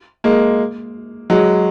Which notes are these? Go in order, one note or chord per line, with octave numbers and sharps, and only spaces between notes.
G#3 A#3
F#3 G#3